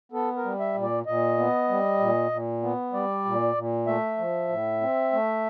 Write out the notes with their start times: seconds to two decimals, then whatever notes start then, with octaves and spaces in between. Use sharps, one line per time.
0.12 B3 A4
0.37 A#4
0.44 G3
0.60 E5
0.74 A#2
0.83 D5
1.06 A#2 D#5
1.38 B3
1.69 G3
1.99 A#2
2.31 A#2
2.63 B3
2.93 G3 D5
3.25 A#2
3.55 A#2
3.86 A3 E5
4.18 F3
4.49 A2
4.81 C4
5.12 A3